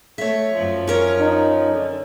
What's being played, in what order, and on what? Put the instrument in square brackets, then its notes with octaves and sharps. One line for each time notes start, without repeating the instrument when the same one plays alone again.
[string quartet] A3 [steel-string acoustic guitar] C#5 E5
[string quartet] F#2 F3
[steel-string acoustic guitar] C#4 A#4 C#5
[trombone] D#4
[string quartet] D3